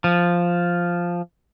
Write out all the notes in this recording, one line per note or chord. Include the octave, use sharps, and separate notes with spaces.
F3